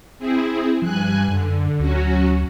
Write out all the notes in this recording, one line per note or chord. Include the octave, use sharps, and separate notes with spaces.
C4 E4 G#4
G2 F3 G#5 F#6
F#2 D3
D2 F#3 C#4 F#4